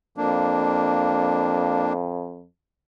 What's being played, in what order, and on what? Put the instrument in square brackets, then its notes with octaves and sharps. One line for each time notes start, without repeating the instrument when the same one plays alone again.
[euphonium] F2 [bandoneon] A#3 D4